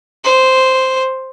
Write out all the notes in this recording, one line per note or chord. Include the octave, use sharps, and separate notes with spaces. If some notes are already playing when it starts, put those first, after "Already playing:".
C5